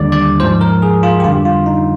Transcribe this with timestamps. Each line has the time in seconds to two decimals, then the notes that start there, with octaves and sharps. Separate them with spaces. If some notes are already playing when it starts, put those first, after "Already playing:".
Already playing: D#2 D3 G3 D5
0.12 D5
0.40 G#2 F3 C5
0.61 A#4
0.82 G#4
1.03 F4
1.20 G4
1.24 F2 D3 G3 F4
1.45 F4
1.66 D#4